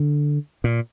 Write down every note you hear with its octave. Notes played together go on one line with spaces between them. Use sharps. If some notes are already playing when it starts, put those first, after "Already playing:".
Already playing: D3
A#2